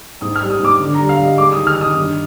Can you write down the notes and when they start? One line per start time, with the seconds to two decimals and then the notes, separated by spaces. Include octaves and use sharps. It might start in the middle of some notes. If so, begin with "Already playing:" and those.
0.21 G#2 D#6
0.36 F6
0.41 G3
0.50 D#6
0.60 G#2 D6
0.79 D3
0.94 G3 A#5
1.09 F5
1.19 G3 D#5
1.38 G#3 D6
1.52 D#3 D#6
1.67 F6
1.77 D#3 D#6
1.96 G2